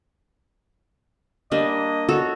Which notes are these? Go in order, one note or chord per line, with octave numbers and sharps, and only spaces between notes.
G3 A#3 D4 D#5
F#4 A4 C#5